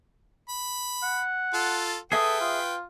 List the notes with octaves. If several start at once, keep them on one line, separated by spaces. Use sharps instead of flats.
B5
F#5
F4 A4
G#4 A4 B4 E5 G5 D#6
F4